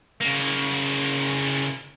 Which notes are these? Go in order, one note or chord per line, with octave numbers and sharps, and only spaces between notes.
C#3 A#3